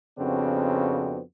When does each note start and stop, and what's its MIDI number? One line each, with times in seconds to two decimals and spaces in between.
0.19 1.20 41
0.19 1.20 49
0.19 1.20 59
0.19 1.20 60
0.19 1.20 62
0.19 1.20 66